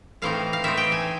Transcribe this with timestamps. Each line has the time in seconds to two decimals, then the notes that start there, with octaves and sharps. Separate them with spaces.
0.22 A2 E3 A3 C4 D#4 F5
0.53 F5
0.64 A2 E3 A3 C4 D#4 E5
0.77 G5
0.92 G#5